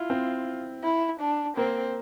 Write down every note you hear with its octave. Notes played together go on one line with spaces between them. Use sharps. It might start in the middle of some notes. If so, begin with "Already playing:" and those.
Already playing: E4 F4
C4
E4
D4
A#3 C4